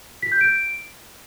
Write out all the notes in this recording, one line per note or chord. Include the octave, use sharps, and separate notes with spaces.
B6
G6
D7